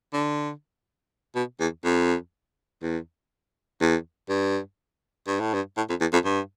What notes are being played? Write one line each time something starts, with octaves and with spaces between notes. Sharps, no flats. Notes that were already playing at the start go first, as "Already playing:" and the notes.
D3
B2
E2
F2
E2
E2
G2
G2
A2
G2
A2
F2
E2
F2
G2